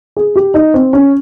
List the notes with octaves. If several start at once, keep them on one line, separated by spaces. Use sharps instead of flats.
G#4
G4
D#4
C4
C#4